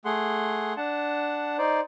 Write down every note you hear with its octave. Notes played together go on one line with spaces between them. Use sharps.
A3 G#4 F#5 C6
D4 F#5 A5
D#4 C5 D5